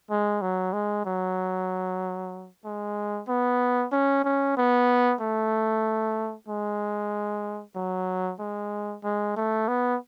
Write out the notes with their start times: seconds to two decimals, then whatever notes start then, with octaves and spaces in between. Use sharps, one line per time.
0.10 G#3
0.42 F#3
0.73 G#3
1.06 F#3
2.65 G#3
3.28 B3
3.92 C#4
4.24 C#4
4.57 B3
5.21 A3
6.49 G#3
7.76 F#3
8.39 G#3
9.04 G#3
9.37 A3
9.68 B3